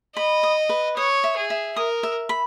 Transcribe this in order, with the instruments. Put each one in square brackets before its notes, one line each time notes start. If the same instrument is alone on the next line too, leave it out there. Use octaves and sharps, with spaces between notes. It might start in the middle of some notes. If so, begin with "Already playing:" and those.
[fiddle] D#5 [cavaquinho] B5
[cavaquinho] D#6
B4
[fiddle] C#5 [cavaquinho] D#6
[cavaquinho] E5
[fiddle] G#4
[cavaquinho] E5
[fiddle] A#4 [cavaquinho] D#6
[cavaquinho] E5
B5